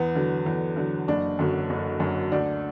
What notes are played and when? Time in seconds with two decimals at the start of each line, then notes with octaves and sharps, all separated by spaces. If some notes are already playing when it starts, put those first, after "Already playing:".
Already playing: E2 B3
0.15 D3 F#3
0.46 E2
0.77 D3 F#3
1.08 F#1 D4
1.39 F#2 D3 F#3
1.70 F#1
2.00 F#2 D3 F#3
2.32 D2 D4